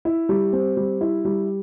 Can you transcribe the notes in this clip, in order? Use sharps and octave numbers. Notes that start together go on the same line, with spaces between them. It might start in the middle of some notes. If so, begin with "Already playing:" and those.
E4
G3
C4
G3
E4
G3